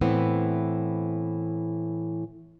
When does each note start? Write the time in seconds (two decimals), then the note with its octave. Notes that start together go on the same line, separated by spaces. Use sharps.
0.01 A2 E3 B3 C4